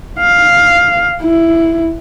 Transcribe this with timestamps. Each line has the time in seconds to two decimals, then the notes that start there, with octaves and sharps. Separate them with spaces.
0.19 F5
1.22 E4